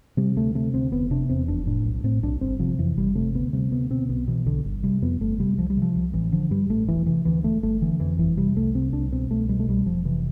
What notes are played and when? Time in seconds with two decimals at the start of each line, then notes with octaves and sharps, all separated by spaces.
0.17 C3 G3
0.37 D2 A3
0.55 C3 A3
0.74 D2 C4
0.92 F1 B3
1.11 C3 D4
1.29 E2 C4
1.48 F1 D4
1.67 A2 D4
1.85 B1
2.04 A2 C4
2.23 B1 D4
2.41 G1 C4
2.59 C3 F3
2.78 F2 E3
2.97 G1 G3
3.15 C3 A3
3.35 D2 B3
3.53 C3 G3
3.72 D2 B3
3.90 B2 C4
4.09 B1 B3
4.27 B2 E3
4.46 B1 D3
4.65 G1
4.83 C3 G3
5.02 F2 B3
5.20 G1 A3
5.39 C3 G3
5.58 C2 F3
5.70 G3
5.77 C3 F3
5.96 C2
6.14 A1 E3
6.32 D3 F3
6.51 G2 G3
6.69 A1 A3
6.88 E1 E3
7.06 C3 E3
7.25 D2 E3
7.44 E1 A3
7.63 G1 A3
7.82 D3 E3
8.00 F2 E3
8.19 G1 E3
8.37 C3 G3
8.55 C2 A3
8.75 C3 C4
8.93 C2 D4
9.12 B2 C4
9.31 C2 A3
9.49 B2 G3
9.60 A3
9.68 C2 G3
9.86 F1 F3
10.05 C3 E3